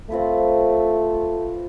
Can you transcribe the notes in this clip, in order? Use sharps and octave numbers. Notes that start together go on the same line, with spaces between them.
A3 C4 F4 B4